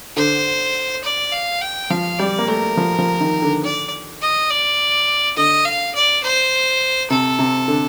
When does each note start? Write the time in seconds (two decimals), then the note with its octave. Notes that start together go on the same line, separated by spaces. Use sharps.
0.17 D3 C5
1.04 D5
1.32 F5
1.61 G5
1.90 F3 F5
2.19 G3 D5
2.39 A#3
2.48 A3 A#4
2.77 F3
2.98 F3
3.21 D#3
3.42 D3
3.63 D5
4.21 D#5
4.50 D5
5.36 D3 D#5
5.65 F5
5.95 D5
6.24 C5
7.10 C3 A4
7.39 C3
7.68 D3